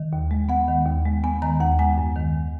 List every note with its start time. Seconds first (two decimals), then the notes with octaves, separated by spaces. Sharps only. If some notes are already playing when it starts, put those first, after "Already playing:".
Already playing: D#3
0.13 D#2
0.31 G#3
0.49 B3 F#5
0.68 D#3
0.86 D#2
1.05 G#3
1.24 B3 G#5
1.42 D#3 A#5
1.61 D#2 F#5
1.79 G#3 G#5
1.98 F#2
2.16 D#3